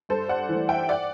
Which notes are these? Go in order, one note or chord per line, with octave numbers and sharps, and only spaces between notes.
G2 A4 C5
D5 F#5
E3
A3
E5 G5
D5 F#5